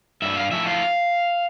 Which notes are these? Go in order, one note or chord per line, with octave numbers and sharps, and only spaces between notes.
G2 E5
F5
F3 A3 E4 E5
F5